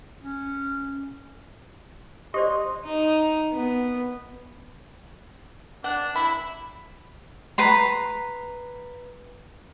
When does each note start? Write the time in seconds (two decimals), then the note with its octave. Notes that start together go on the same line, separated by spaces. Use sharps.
0.22 C#4
2.34 G4 C5 D5 D#5 C6
2.85 D#4
3.53 B3
5.84 D4 F#5
6.15 E4 B5
7.58 B4 A#5 C6